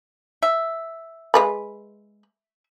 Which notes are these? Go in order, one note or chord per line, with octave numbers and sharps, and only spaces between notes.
E5
G#3 B4 B5